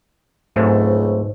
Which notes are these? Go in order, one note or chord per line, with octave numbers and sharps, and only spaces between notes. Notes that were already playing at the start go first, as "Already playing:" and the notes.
C#2 G#2 F#3 A3 C4